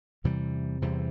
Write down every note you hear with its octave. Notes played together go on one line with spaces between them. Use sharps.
E2 C3 E3 G3
E2 C3 E3 G3